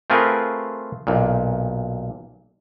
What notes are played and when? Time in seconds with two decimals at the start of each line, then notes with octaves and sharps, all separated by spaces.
0.10 A3 C4 F4 G#4 A#4 B4
1.07 B1 A#2